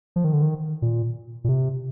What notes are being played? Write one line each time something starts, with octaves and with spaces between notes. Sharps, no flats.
F3
D#3
D3
D#3
A#2
A#2
C3